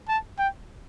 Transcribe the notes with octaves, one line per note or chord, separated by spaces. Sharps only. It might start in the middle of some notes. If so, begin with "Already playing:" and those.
A5
G5